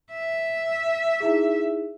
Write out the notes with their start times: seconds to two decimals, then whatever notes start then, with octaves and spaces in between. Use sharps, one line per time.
0.12 E5
1.20 D#4 E4 G#4